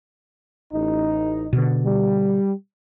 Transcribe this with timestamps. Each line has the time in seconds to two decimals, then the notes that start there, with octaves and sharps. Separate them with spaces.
0.73 A1 D#4
1.53 B2 D3
1.85 G3